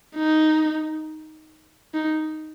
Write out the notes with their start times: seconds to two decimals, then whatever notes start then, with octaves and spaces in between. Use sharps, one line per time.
0.16 D#4
1.94 D#4